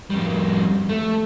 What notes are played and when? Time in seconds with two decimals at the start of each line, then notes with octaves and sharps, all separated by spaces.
0.10 F2 G3
0.89 A3